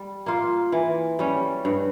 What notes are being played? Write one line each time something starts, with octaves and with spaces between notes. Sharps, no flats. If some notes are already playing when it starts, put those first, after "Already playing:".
Already playing: G3
A#3 F4
E3
G3 C#4
G2